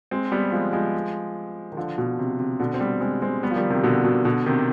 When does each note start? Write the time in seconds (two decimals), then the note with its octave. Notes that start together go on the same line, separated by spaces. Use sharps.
0.11 G#3 C4
0.32 G3 B3
0.52 F3 G#3
0.73 F3 G#3
1.72 D#3
1.77 D3 F3
1.98 B2
2.19 C3
2.40 C3
2.60 B2 D3
2.74 C4
2.80 G3 B3
3.01 G#3 C4
3.22 G#3 C4
3.43 G3 B3
3.51 F3
3.56 D#3 G3
3.70 C3 D#3
3.83 B2 D3
4.04 B2
4.25 B2 D3
4.46 C3 D#3